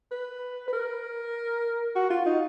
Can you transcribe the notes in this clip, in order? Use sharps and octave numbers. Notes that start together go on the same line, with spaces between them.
B4
B4
A#4
F#4
F4
D#4